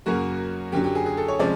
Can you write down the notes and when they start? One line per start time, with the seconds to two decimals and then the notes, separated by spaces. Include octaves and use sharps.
0.06 F#2 C#3 F#3 A#3 C#4 F#4
0.72 F#2 D3 F#3 G4
0.84 G4
0.95 G#4
1.06 G#4
1.17 A4
1.28 C#5
1.39 C3 F3 G#3 C#4 D5